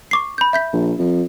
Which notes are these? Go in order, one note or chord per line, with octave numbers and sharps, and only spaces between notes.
C#6 D6 C7
B5 G6
E5 G6 B6
A#1
F2